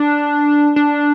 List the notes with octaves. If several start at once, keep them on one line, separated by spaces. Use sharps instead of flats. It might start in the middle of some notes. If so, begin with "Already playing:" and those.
Already playing: D4
D4